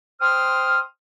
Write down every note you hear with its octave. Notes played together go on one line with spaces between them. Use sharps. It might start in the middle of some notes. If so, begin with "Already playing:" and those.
C5 G5 C6 D#6 F6